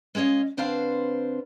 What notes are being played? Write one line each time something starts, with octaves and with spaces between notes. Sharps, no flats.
G#3 C#4 C#5 D#5 F5
D3 C4 D4 B4 C5 F5